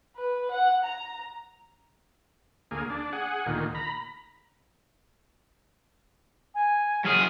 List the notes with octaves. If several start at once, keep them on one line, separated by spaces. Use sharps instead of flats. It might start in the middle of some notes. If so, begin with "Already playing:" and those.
B4
F#5
A#5
D2 A#3 G#4
D4
G#4 F#5
D2 A#2 D#3
A#5 B5
G#5
F#2 G#4 F6